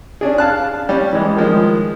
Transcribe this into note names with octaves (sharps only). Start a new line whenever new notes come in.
C#4 D4 G#4
F5 A5 F#6
G3 C#4
E3 G#3
D#3 F3 G#3